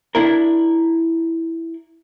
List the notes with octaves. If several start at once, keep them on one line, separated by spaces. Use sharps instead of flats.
D4 E4 A#4